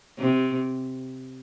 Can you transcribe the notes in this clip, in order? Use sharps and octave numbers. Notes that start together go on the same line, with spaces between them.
C3